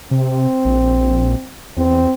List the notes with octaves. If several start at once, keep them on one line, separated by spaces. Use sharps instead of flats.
C3 C4
A#1
E2 C4